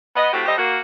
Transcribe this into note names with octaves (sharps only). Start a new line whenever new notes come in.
B3 D#5
A2 A3 C4 E4 F#4 G4
G3 G4 A4 C5 D#5
A#3 F#4